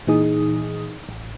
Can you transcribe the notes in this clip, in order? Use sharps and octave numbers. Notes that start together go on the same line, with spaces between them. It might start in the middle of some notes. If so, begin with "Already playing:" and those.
A#2 E3 D#4 G#4 D#6
A1